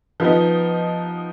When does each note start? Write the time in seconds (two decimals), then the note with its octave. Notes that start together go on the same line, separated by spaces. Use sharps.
0.20 F3 B3 D#4